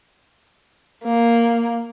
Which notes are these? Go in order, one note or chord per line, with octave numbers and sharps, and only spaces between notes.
A#3